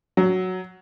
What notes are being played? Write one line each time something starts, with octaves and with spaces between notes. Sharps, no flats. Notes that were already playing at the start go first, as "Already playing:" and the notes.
F#3